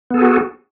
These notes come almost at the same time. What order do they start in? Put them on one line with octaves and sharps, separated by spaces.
B3 A4 G#4 F#4